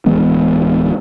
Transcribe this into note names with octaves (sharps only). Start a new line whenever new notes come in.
D1 E3 G#3 B3